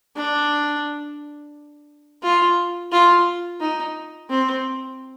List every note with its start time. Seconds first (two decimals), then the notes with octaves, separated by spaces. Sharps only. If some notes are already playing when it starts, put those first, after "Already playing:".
0.16 D4
2.23 F4
2.92 F4
3.61 D#4
4.30 C4